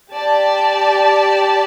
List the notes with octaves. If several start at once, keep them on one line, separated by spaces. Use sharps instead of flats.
G4 D5 A5